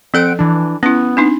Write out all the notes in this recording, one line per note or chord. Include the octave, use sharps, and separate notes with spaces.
F3 C4 A4 F#5 D7
E3 D4
B3 C#4 E4
C4 D4 D#4